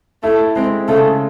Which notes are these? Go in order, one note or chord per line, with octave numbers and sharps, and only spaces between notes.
A3 E4
G#3 C4
C#3 A3